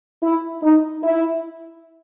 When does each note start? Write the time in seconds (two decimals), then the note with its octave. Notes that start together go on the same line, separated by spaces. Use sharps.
0.22 E4
0.62 D#4
1.02 E4